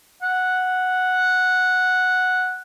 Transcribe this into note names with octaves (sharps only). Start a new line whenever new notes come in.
F#5